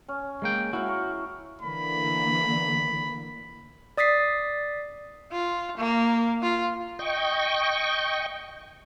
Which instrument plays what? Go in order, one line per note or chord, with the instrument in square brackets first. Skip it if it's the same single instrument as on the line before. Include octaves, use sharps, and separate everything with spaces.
[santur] C#4
[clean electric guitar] G#3 A#3 G5
[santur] E4 F5 [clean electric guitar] F#4
[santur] G5 A#5 C#6
[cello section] D3 E3 A#3 [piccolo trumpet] B5
[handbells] D5 D#6 A6 B6 C7
[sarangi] F4
A#3
F4
[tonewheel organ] D#5 G5 C#6